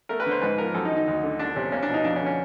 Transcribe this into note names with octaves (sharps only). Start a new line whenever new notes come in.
A3 A#4
B4
D3
C5
G#2 B4
F3 A#4
F#2 A4
D#4
D#3
D#4
D2
D3
C2 D4
C3 C#4
A#3 C#4
D4
B2
D#4
F2 D4
C#4
D3
C#4